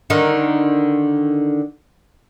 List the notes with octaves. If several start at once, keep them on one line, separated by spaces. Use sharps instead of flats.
D3 D#3